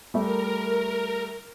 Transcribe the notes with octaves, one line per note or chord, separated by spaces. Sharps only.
G3 A3 A#4